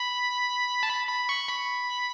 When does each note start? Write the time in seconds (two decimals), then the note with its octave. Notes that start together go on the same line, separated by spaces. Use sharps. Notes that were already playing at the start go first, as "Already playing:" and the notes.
Already playing: B5
0.83 A5
0.89 B5
1.09 B5
1.29 C#6
1.48 B5